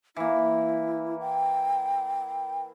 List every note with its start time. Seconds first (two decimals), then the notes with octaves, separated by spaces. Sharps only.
0.16 E3 A#3 E4
1.20 G5